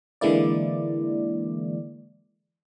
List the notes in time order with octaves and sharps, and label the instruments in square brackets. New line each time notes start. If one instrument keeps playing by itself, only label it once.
[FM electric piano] D3 E3 G#3 A#3 E4 D5